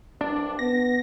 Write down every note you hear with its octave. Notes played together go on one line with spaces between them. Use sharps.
C2 G2 D4
B3 A#6